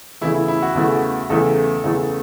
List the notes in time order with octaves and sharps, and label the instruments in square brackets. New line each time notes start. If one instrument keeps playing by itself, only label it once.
[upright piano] E2 C#3 E3 A3 [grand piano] E4
[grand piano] E4
E4
F#4
[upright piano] E2 C#3 E3 A3
[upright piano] E2 C#3 E3 A3 [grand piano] A4
[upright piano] E2 C#3 E3 A3